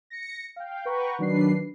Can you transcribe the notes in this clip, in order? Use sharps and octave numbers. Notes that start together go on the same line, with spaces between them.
A#6 C#7
F5 G5
B4 F#5 G5 A#5 C#6
D#3 F#3 D4 B4 C7